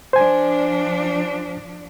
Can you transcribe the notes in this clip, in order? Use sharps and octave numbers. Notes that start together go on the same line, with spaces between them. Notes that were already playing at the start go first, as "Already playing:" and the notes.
F3 D4 C5 G#5